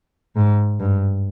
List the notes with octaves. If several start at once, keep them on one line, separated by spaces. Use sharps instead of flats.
G#2
G2